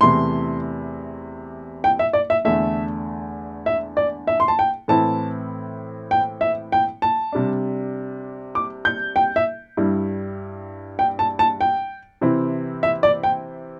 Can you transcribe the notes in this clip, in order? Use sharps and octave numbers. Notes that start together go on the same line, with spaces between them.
E2 C3 E3 A3 E4 C6
G5
E5
D5
E5
E2 D3 A3 E5
E5
D5
E5
C6
A5
G5
A2 E3 C4 E4 A5
G5
E5
G5
A5
C3 G3 D4
D6
G6
G5
E5
G2 G3 E4
G5
A5
A5
G5
C3 E3 C4 E4
E5
D5
G5